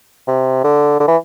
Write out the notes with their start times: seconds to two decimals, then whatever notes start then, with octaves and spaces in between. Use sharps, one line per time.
0.28 C3
0.64 D3
1.00 D3
1.08 E3